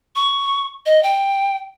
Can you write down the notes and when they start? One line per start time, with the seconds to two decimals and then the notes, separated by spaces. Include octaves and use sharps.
0.16 C#6
0.86 D#5
1.03 G5